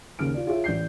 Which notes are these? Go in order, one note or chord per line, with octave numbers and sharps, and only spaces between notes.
D#2 C#3 F6 D7
F4 D5
F4 G#4 C#5 E5
A1 D5 G6 C7